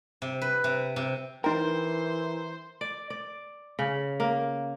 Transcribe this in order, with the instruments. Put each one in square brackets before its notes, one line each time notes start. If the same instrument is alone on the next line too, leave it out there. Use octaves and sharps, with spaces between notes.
[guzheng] C3
B4
C3
C3
[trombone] E3 [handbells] D#4 G5 [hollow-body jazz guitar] A#4 [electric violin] C5 C6
[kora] D5
D5
C#3
A#3